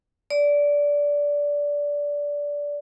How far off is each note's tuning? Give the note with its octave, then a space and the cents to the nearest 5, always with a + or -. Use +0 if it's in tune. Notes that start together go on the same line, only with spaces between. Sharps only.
D5 -15